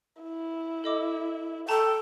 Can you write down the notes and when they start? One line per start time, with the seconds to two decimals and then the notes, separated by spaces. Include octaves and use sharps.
0.22 E4
0.84 A4 D#5 D6
1.69 A4 G5 A5 A#5